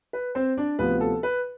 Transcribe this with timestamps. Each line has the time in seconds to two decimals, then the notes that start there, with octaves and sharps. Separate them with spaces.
0.13 B4
0.35 C4 C5
0.58 D4 D5
0.78 D2 C3 F3 B3 B4
1.01 A4
1.23 B4